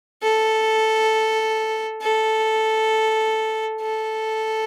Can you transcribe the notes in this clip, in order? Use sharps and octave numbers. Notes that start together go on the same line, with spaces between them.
A4
A4
A4